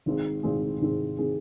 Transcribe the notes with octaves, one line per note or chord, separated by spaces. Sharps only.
G#1 G#2 D#3 C4 G#4
G#1 G#2 D#3 C4 G#4
G#1 G#2 D#3 C4 G#4
D#3 C4 G#4